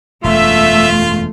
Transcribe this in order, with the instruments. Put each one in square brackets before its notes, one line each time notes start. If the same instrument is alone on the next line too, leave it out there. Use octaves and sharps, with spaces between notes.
[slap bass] E1 F#2 [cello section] A3 [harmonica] F4 [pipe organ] E5